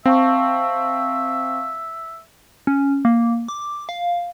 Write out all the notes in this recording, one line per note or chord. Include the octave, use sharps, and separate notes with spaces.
C4 E5 F5 A5 C#6
C#4
A#3
D6
F5